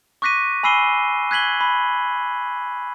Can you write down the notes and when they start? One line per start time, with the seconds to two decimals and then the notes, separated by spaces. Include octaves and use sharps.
0.22 C#6 D6 F#6 A#6 B6 D#7
0.63 G#5 B5 E6 C7 D#7 G7
1.31 F#6 G#6 B6 F#7 G7
1.61 B5